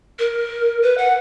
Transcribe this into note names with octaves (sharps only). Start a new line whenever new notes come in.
A#4
B4
F#5